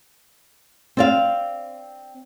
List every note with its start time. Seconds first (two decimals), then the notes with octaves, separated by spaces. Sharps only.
0.97 C4 D5 F5